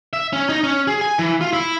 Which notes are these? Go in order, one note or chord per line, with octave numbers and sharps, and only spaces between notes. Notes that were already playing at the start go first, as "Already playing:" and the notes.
E5
C#4
D#4
C#4
G#4
G#5
E3
F4
E4